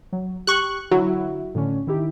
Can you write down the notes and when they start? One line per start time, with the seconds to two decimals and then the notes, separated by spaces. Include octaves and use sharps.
0.13 F#3
0.47 G4 C#6 F#6
0.91 D3 F#3 E4 F#4
1.55 A2 D3 C#4
1.87 D#3 E4 G4